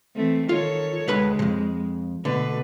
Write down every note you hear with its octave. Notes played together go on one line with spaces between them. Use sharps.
E3 A3 C4
D#3 F4 A4 C#5
D2 G#3 B4 B5
F2 C3
B2 D3 A3 B4